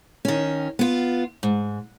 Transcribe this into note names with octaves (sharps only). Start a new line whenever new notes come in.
D#3 C#4
B3 F4
G#2